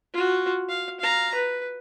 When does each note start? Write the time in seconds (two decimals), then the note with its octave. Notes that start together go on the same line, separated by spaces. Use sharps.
0.14 F4 F#4
0.69 F5
1.00 F5 A#5
1.35 B4